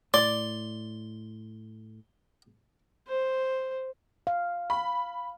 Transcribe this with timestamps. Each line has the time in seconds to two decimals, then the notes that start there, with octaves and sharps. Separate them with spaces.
0.14 A2 D5 C6
3.07 C5
4.27 F5
4.70 B5